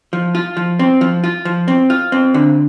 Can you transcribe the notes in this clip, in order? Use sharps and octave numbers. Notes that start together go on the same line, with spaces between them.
F3
F4
F3
C4
F3
F4
F3
C4
F4
C4
D3